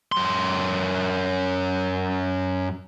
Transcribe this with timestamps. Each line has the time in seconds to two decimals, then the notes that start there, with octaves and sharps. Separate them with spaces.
0.12 F#2 C6